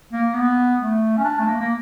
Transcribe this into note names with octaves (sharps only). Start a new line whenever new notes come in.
A#3
B3
A3
C#4
D4
A3
A#3
A#3